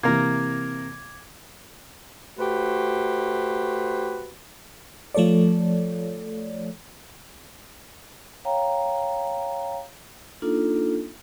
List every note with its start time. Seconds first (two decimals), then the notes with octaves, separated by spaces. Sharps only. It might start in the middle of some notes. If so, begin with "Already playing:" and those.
0.03 C3 E3 A#3 A#4 D6 G#6
2.39 A3 F#4 G4 B4 C5
5.14 F3 A3 A4 C#5 D5
8.45 C#5 F5 G5 A#5
10.42 A#3 D4 D#4 F4 A4